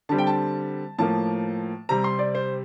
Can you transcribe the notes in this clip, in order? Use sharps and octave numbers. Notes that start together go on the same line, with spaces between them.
D3 G3 C4 A5
G5
A5
A2 F3 A#3 A5
C3 G3 C4 A#5
C6
D5
C5